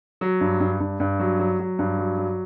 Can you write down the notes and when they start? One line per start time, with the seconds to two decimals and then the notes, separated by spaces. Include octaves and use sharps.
0.21 F#3
0.41 G2
0.60 G2
0.80 G2
1.00 G2
1.20 F#3
1.40 F#3
1.59 F#3
1.79 G2
1.98 F#3
2.18 F#3